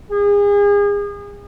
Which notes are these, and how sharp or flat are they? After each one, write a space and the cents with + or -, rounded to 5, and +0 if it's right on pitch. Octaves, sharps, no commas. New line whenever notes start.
G#4 -35